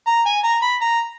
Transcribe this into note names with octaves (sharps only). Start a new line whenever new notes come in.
A#5
G#5
A#5
B5
A#5